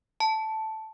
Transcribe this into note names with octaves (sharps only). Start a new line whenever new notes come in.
A5